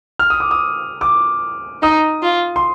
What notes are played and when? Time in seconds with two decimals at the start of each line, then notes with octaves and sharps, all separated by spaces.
0.19 F6
0.30 D#6
0.40 D6
0.51 D#6
1.01 D6
1.82 D#4 D#6
2.23 F4
2.56 C6